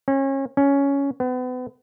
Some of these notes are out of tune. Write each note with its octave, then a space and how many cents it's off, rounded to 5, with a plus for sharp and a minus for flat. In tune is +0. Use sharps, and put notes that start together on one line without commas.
C#4 -30
C#4 +10
B3 +35